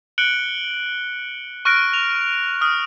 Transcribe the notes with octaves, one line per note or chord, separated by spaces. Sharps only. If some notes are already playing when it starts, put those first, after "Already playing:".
F#6 C#7 D7 F#7 G7
C#6 F6 F#6 A#6 D7
F7
D#6 F6